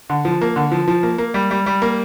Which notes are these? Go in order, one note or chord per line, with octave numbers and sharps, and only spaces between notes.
D3
F3
A#3
D3
F3
F3
A#3
A#3
G3
G3
G3
A#3